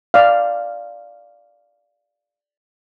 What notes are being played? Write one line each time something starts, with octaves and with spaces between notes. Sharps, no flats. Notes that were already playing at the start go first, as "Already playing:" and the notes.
D5 F5